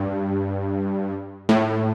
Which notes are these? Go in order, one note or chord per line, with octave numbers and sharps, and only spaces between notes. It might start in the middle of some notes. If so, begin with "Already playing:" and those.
Already playing: G2
A2